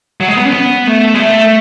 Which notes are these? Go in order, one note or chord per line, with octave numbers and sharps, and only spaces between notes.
F#3
G#3
B3
C#4
B3
A3
G#3
A3